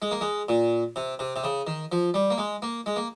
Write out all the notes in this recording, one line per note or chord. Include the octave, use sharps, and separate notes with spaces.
G#3
A#3
G#3
A#2
C3
C3
C3
C#3
D#3
F3
G3
A#3
G#3
A#3
G#3
A#3